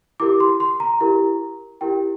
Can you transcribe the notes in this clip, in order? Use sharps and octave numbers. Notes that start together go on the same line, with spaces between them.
E4 G4 A#4 D6
C6
C6
A#5
E4 G4 A#4
E4 G4 A#4 G5